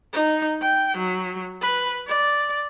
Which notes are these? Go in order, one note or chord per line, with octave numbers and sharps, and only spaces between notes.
D#4
G5
F#3
B4
D5